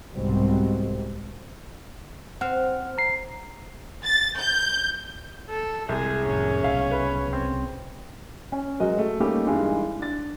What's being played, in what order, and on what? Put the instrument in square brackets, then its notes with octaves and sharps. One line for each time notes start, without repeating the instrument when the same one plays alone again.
[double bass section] C2 G#2 B2 G3 C4
[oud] C4 [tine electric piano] F#5 F6
[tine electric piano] A#5 C7
[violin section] A6
G6
[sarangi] A4
[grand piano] C2 [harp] G#3 C6 [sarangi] G#4
[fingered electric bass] F1 A2 [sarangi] C#4
[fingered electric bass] C2 B2 [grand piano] E5 F5
[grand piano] B4
C4
[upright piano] C#4
F#3 G#3 F#4 A#4 D#5
A3
G3 A3 A#3 C#4 D#4 G4
G2 E3 G#3 D#4
D4 A6